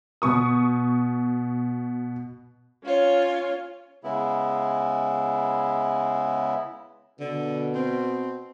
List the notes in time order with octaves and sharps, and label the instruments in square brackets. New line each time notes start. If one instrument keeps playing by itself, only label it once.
[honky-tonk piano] B2 C#6 D#6
[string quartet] C#4 F4 C#5
[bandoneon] C#3 G#3 B3 E4
[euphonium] B2 [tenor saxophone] D3
[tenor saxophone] C4